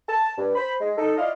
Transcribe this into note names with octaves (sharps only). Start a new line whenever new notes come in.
A5
G2
C5 B5
G#3
D#4 A4
E4 F4 D5 D#5 F5